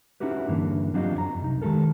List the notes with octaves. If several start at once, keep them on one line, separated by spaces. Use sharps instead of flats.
C#4 D#4 E4 F#4 G4 B4
G2 D3 E3 A#3
F#3 C4 D4 F4 G4 D#5
F#2 C#5 A#5
C2 D#4
D#3 G#3 A3 G4 A4 A#4